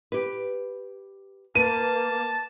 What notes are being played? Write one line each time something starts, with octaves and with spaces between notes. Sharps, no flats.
G4 B4
A#3 B4 A5 D#7